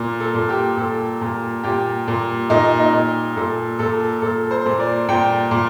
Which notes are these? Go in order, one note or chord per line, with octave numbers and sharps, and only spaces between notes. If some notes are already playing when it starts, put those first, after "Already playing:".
Already playing: A#2
A4
A#2
G4
A#2 A4
A#2
A#2 G4
A#2
A#2 D#4
D#4
A#2
A#2 A4
A#2 A4
A#2 A4
C5
A#2
D5
A#2 G5
A#2